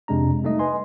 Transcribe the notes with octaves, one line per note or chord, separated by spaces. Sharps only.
F2 C3 G#3 D4 A#5
G3 A3 D#4 D#5
B4 D#5 G#5 C6